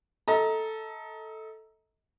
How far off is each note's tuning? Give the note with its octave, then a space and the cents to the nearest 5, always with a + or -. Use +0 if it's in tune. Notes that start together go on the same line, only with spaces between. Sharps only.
A4 +0 D#5 +35 A#5 +0